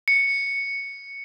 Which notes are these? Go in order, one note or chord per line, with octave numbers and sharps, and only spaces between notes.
C#7